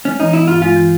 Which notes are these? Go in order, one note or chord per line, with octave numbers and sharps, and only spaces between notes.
G#3 C#4
E3 D#4
B3 E4
G2 F4
G#3 F4
E3